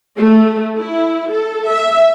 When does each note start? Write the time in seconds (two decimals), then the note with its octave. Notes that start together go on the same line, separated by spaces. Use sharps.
0.18 A3
0.78 E4
1.30 A4
1.70 E5